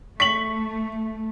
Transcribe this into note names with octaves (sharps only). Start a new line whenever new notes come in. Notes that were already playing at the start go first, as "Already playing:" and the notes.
A3 C#6 B6 F#7